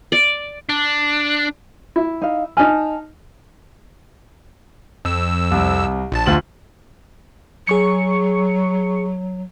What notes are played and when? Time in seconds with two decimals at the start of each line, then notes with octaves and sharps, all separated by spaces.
0.12 D5
0.69 D4
1.96 E4
2.22 D#4 F5
2.57 D#4 G#5 A5 F6
5.05 F2 E6
5.51 C2
6.12 A#1 A5
6.26 D2 F4 F#7
7.67 F#3 G#4 C#6 C#7